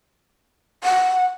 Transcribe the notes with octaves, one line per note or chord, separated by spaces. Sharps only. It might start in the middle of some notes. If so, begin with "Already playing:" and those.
F#5